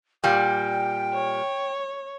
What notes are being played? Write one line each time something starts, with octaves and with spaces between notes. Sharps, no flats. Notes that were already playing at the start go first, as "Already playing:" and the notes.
A#2 G3 G5
C#5